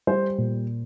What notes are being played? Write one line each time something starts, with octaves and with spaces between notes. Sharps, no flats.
G3 C5
A#2